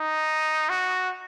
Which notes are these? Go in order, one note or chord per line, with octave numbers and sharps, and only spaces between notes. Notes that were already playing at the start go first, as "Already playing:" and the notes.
Already playing: D#4
F#4